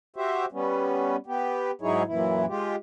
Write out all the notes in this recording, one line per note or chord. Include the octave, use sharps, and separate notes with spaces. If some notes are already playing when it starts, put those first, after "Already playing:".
F#4 G4 C5 E5
G3 B3 C#4
B3 G4
G#2 F#3 D#4 E4 G#4 C#5
F#2 A#2 E3 E4
G#3 F4 G4